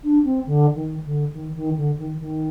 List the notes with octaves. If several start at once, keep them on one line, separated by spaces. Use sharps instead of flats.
D4
C4
D3
D#3
D3
D#3
D#3
D3
D#3
D#3